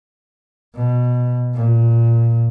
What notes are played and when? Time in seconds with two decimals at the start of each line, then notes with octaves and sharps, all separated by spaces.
0.75 B2
1.54 A#2